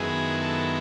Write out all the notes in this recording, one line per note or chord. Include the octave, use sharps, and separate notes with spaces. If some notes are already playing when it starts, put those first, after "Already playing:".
Already playing: F#2 D#3 G#3 B3 E4 G#4
A4